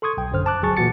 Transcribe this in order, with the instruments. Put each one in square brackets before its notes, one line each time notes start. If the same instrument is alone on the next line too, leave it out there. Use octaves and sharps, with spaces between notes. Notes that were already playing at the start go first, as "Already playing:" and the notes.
[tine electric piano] A4 C6 C#6 D#6 G#6
B1 G5
G#1 F#2 D3 C5 F6
A5 D6 F#6
G1 C#2 F#3 G#4 C#6 A6
A#2 E3 E4 F#4 A6 C#7